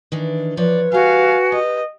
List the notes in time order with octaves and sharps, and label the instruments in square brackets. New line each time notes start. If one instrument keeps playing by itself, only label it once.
[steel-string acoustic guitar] D#3 E3 D4
[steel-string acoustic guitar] F3 C#5 [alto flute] B4 [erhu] D5
[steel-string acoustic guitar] G3 G4 [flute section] F#4 G#5 [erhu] F5
[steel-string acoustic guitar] G4 [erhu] D#5